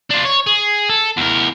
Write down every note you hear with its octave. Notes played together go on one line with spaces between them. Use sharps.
D4 F4
C#5
G#4
A4
E2 A#4